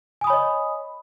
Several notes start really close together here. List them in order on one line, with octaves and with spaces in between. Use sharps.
G#5 D#6 B5 C#5 D#5